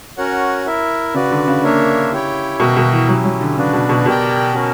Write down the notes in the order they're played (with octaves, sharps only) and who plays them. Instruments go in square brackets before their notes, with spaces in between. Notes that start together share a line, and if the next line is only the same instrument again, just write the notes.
[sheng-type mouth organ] C#4 F#4 A#4 C#5 F#5
E4 A#4 E5
[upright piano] C#3 [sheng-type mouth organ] F#4 B4 D5
[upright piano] D3
C#3
[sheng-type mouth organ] A#3 D4 A#4 C#5 E5
E4 G4 C#5 G5
[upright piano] B2 [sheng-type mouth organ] F#4 A#4 E5 G5
[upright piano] B2
E3
[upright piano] F#3 [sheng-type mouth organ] C#4 E4 G4
[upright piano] F#3
D3
[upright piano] C#3 [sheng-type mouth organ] D4 F#4 B4 D5
[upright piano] B2
B2
[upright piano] B2 [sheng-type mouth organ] G4 A#4 D5 G5
[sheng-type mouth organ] C#4 F#4 A#4